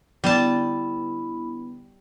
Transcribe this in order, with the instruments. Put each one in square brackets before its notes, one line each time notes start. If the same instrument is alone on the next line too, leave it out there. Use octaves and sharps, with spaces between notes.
[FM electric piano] D3 B3 [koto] G3 A5 [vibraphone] E4 B5